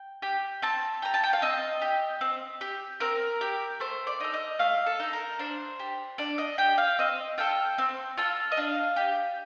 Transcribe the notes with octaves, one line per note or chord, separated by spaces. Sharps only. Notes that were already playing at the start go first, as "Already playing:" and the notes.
Already playing: G5
G4
C4 A5
G4 A#5
A5
G5
F5
C4 D#5
G4
C4
G4
C4 A#4
G4
A3 C5
D5
D#4 A4
D#5
A3 F5
A4
D#4 A4
A#4
D4 C5
G4
D4 D5
D#5
G4 G5
F5
C4 D#5
F4 A4 G5
C4
F4 A4
D#5
D4 F5
G4